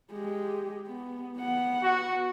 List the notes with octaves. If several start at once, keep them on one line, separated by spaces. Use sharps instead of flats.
G#3 G4
B3
B3 F#5
F#4